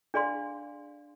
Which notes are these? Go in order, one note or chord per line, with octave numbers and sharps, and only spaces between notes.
D4 G#4 D5 F5 C6